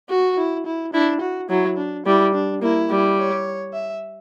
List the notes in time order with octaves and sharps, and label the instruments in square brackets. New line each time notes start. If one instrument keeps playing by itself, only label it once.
[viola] F#4
[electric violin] E4
E4
[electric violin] D4 [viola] E4
[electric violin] F#4
[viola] F#3 [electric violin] E4
[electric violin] D4
[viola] G3 [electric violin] E4
[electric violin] D4
[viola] A#3 [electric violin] E4
[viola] G3
[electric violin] C#5
E5